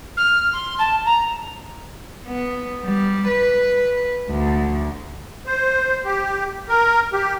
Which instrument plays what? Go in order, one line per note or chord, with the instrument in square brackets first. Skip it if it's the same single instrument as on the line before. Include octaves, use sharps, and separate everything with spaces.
[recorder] F6
C6
A5
A#5
[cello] B3
G3
B4
D2
[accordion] C5
G4
A#4
G4